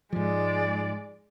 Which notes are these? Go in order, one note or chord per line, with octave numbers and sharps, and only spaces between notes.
G#2 F3 G#3 D5